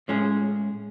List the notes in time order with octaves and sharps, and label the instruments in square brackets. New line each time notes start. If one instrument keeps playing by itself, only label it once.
[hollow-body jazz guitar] A2 G#3 C#4 G#4